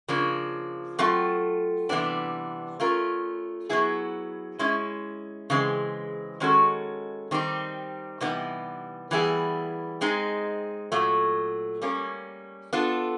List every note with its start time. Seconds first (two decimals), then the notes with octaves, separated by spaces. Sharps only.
0.08 C#3 F3 A#3 D4
0.99 F#3 A3 C4 F4 A4
1.89 C3 E3 G3 B3 D4
2.80 A3 C#4 F4 A#4
3.69 F#3 B3 E4 G#4
4.59 G#3 C#4 E4
5.50 C#3 E3 G#3 C4
6.40 D#3 G#3 C#4 F#4 A4
7.31 D#3 G3 C4 D#4 G4
8.21 C3 E3 G3 B3 D#4
9.11 E3 G3 B3 E4 G#4
10.01 G#3 C4 D#4 G#4
10.92 A#2 F#3 A3
11.82 G3 A#3 C#4
12.73 B3 D4 F4 A4